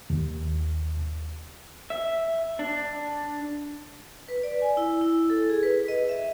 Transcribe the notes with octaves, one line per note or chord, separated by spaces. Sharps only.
D#2
E5
D4
B4
D5
G#5
E4
E4
A4
G#4
B4
D#5
E5